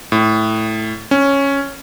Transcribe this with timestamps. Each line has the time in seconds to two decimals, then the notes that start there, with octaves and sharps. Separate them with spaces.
0.12 A2
1.11 C#4